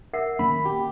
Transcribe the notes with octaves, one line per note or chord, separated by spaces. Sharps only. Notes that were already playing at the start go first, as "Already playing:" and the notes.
A#4 E5 F#5
D#3 A#3 C#4 B5
G4